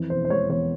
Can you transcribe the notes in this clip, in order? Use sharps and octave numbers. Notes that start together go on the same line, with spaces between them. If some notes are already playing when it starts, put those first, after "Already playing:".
Already playing: F2 E3
E1 C5
C5
G#3 C#5
E2 C#5